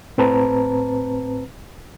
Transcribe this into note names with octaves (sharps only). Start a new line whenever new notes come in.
A2 C4 B4 A5 A#5